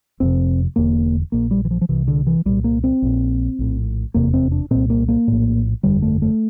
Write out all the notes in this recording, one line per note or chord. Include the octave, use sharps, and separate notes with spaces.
F1 F2 C3 C4
E1 E2 D3 A#3
A#1 A#2 A#3
G3
E3
F3
F3
C2 C3 E3
D3
E3
C2 A#2 G3
A#3
C4
A#1 A#2
A#1 A2
F1 E2 C3 A#3
C4
D4
C2 A#2 C4
A#3
A#3
A#1 A2
G1 F2 D3 G3
A3
A3